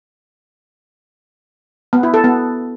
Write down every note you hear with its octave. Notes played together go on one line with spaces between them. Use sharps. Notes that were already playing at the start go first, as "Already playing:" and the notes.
B3
E4
A4
B3